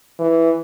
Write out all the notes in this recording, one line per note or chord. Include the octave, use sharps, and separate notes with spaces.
E3